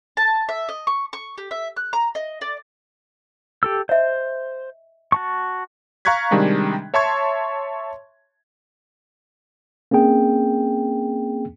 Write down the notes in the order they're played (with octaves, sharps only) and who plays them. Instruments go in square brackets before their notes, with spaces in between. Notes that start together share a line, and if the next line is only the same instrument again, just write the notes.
[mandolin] A5
E5
D#5
C#6
C#6
G4
E5
F#6
A#5
D#5
D5
[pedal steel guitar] G4 A4 E6
[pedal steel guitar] C5 [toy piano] D#5 E5
[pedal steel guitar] F#4 A5 C#6
[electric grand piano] F5 A#5 C#6 F#6 G#6 B6
C3 D#3 G3 G#3 D4
C#5 E5 A5 C6 C#6 G#6
[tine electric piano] A#3 C4 C#4 G#4 G5